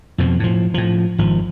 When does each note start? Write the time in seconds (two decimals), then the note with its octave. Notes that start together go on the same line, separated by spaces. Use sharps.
0.18 F2 B2 F3
0.40 A2 F3
0.74 A2 F3
1.18 G#1 F3